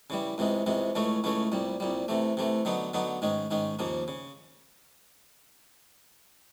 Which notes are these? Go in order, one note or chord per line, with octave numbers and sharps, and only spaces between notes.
C#3 E3 G3
C#2 C3 E3 G#3
C#2 C3 E3 G#3
C#2 C#3 E3 A3 C#4
C#2 C#3 E3 A3 C#4
C2 A#2 G3
C2 A#2 G3
C3 E3 A3
C3 E3 A3
D3 F#3 B3 D#4
D3 F#3 B3 D#4
G#2 D#3 G#3 C#4
G#2 D#3 G#3 C#4
D#2 C#3 F3 A#3
C#3